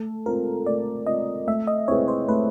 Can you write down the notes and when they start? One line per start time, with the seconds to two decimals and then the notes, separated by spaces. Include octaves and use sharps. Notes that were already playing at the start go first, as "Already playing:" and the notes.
Already playing: A3 A4
0.26 C4 F4 A#4
0.66 A3 D5
1.07 C4 F4 D#5
1.47 A3 E5
1.67 D#5
1.88 C4 E4 G#4 B4 C#5
2.08 C5
2.28 A3 B4